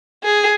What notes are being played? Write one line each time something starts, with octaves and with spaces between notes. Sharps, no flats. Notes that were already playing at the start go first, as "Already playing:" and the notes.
G#4